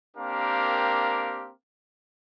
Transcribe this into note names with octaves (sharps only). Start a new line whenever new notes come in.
A#3 C4 D4 G4 A#4 F5